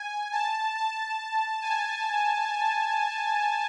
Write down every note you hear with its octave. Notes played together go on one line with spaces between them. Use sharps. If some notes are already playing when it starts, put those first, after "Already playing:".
Already playing: G#5
A5
A5
G#5